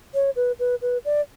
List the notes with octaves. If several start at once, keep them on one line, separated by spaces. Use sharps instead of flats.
C#5
B4
B4
B4
D5